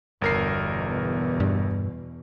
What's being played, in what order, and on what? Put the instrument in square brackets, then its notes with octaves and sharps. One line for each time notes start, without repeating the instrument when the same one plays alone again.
[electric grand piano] G1 A#4 C7 [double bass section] E2 B2
[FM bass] G2